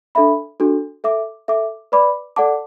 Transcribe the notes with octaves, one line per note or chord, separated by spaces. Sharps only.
D4 A4 E5 B5
D4 F#4 A4
A4 E5 D6
A4 E5 D6
B4 D5 B5 D6
A4 D5 F#5 A5 D6